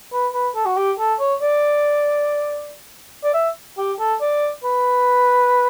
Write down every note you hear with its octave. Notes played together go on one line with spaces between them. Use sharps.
B4
B4
A4
F#4
G4
A4
C#5
D5
D5
E5
G4
A4
D5
B4